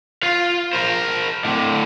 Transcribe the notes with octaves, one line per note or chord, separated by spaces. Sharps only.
F4 F5
A#4 C5
A2 D3